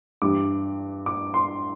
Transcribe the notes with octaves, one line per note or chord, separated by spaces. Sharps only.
G2 E3 G3 D6
D6
C6